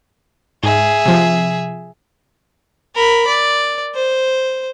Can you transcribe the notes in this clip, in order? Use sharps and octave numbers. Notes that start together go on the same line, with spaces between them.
G#2 G#4 E5
C3 F3
A#4 B5
D5
C5